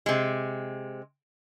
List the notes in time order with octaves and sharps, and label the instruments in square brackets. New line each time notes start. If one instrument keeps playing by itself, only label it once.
[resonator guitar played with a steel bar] C3 G#3